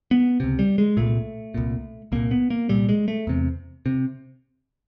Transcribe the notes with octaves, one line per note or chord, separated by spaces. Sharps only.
B3
C#2 C3
G3
G#3
C2 A#2 A3
C2 A#2
C2 A#2 A#3
B3
A#3
C2 A#2 G3
G#3
A3
E2 C3
C3